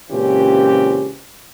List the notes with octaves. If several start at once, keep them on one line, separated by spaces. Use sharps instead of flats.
C#2 A#2 E3 C4 C#4 G4